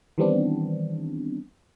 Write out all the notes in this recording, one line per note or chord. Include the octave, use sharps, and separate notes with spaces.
D#3 E3 G3 B3 C4 D4